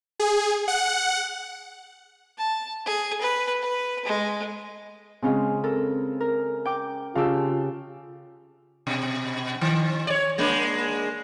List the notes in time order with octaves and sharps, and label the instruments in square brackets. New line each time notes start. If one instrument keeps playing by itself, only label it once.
[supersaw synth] G#4
F#5
[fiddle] A5
G#4
B4
B4
G#3
[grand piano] C#3 G#3 [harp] C4 C#4 F4
[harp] A4 A#4
A#4
G5 D6
[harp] C#3 G4 [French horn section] F4 [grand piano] F5 A5 E6
[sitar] B2
D#3
C#5 D5
G#3 A#3 D4